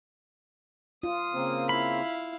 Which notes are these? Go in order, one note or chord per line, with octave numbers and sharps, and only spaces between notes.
F4 D#6
C#3 A#3 C4
E4 F5 B5